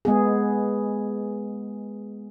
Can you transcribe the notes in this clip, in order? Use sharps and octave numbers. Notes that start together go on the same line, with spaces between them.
G#3 B3 G#4